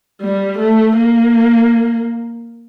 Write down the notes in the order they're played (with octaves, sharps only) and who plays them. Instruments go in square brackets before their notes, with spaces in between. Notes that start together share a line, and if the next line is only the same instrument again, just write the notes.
[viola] G3
A3
A#3